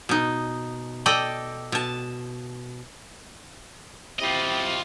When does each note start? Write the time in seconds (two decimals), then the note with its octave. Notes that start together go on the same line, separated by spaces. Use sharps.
0.09 B2 D#4
1.06 A4 D5 D#5 G5
1.72 B2 A5
4.20 C4 E4 F4 G4 D#5